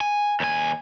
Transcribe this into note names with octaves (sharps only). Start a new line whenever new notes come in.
G#5
D#2 G#5